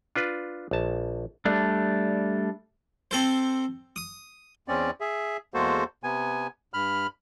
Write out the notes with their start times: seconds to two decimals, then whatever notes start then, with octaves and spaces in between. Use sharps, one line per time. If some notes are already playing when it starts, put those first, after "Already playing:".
0.16 D4 F4 B4
0.71 A#1 A5
1.45 G3 A3 D4
3.11 C4 A4 C5
3.96 D#6
4.68 E2 C4 C#4 D5
5.01 G#4 E5
5.54 E2 G#3 A#3 F#4 A4 C5
6.03 C3 B3 G#5
6.74 G2 B5 F6